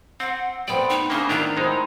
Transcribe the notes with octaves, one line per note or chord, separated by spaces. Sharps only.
C4 F#5
A3 B3 C4 D5 G5
D#4
C#3 A#3 D4
D#3 D4 E4 F4 A#5
G#3 C4 D#4 E4